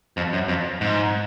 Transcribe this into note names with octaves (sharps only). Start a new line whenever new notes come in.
F2
F#2
F2
G#2